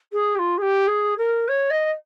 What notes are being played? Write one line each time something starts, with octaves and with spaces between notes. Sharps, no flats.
G#4
G4
F4
G#4
G4
G#4
A#4
C#5
D#5